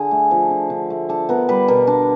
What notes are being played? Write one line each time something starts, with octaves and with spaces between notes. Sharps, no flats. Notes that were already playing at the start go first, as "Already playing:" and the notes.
Already playing: D3 G#4
A3
F3
D3
D3
A3
D4 A4
B3 A#4
G3 B4
B2 A#4
D4